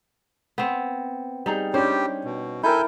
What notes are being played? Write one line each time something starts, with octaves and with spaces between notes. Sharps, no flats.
B3 C4
G3 D#4 G#4
G3 C#4 D4 G4 C5
B2
E4 A4 A#4 G5 G#5 G6